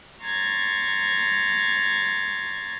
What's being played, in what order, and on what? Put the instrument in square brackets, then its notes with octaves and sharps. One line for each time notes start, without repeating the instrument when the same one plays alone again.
[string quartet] A#5 C6 C#6 G#6 A6